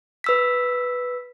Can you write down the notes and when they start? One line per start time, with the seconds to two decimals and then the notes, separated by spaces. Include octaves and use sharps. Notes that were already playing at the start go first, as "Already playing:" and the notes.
0.24 B4 E6 B6